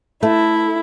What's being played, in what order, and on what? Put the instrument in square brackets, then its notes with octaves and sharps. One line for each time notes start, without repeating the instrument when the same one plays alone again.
[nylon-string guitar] A3 [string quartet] E4